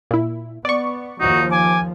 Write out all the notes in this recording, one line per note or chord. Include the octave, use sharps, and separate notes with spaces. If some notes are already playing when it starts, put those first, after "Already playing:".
A#2 E4
B3 D5 C#6
D#2 F3 D#4 F#4
G#5 D6